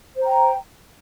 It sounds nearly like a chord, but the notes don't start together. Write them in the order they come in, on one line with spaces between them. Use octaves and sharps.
C5 A#5 G5